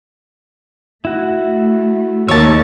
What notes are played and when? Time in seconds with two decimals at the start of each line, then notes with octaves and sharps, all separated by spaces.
1.05 A3 E4 F#4
2.28 D#2 G4 C#5 A5 D6 E6